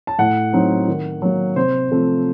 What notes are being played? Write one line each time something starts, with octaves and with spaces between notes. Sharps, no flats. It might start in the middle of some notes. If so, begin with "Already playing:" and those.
A5
A2 F#5
F#3 C4 D#4
D#3
F#3 A#3
C3 C5
F3 A3 C4